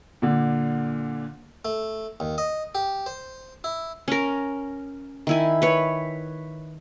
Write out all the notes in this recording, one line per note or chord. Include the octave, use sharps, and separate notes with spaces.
A#2 D3
A3
D#2
D#5
G4
C5
E4
C#4 A#4
D#3 E4 G#5
B4 C#5